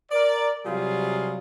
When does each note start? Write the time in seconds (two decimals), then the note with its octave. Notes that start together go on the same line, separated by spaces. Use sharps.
0.12 A#4 D5
0.66 C3 F#3 G3 F4 G#4